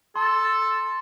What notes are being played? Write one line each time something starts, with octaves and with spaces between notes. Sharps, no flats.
A4 A5 C6